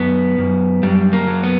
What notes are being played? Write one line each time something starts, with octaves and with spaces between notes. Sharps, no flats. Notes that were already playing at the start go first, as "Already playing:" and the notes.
Already playing: F#2 B3
F#2
F#2 G3
A#3
F#3
B3